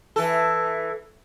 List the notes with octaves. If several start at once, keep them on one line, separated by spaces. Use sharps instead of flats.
E3 A4